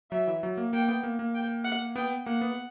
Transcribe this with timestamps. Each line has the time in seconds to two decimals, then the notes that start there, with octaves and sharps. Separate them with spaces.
0.11 F#3 E5
0.27 E3
0.43 F#3
0.57 A#3
0.73 A#3 G5
0.88 B3
1.03 A#3
1.19 A#3
1.35 G5
1.64 F#5
1.96 B3 G5
2.26 A#3 F#5
2.41 B3